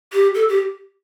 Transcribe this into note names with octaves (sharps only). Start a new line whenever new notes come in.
G4
A4
G4